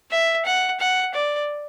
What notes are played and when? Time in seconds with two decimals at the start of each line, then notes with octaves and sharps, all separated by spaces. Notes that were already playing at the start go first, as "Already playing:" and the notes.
0.11 E5
0.45 F#5
0.80 F#5
1.14 D5